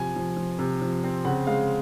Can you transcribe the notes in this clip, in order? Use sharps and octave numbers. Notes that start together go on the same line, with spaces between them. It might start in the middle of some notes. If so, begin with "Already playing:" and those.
Already playing: C3 F3 G#5
F3
F3
C3
F3
C4
C#3 F#5
G#3 F5